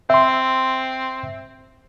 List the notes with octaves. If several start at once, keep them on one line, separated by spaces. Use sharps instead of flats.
C4 E5 C6